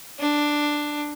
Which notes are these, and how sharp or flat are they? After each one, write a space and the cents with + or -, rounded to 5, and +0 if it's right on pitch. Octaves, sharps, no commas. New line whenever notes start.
D4 +5